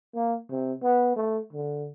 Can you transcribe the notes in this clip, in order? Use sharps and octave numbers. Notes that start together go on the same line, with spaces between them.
A#3
C3
B3
A3
D3